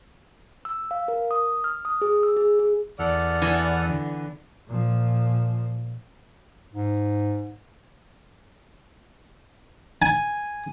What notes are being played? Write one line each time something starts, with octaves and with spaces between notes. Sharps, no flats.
E6
F5
A#4
D#6
F6
D#6
G#4
E6
G#4
G#4
E2 A4 D5 F#5 F6
E3 B3
D3
A#2 F3
G#2
G#5